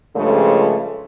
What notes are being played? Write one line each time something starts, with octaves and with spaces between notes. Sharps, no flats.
G2 C#3 F3 G#3 A3 C#4